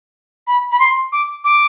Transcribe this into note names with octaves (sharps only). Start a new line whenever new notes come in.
B5
B5
C6
D6
D6